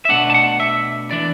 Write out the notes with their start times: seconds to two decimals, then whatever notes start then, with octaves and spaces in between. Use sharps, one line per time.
0.05 E5
0.09 B2 A3 D4 F#5
0.30 A5
0.34 F#5
0.60 E5
1.11 E3 D4 D5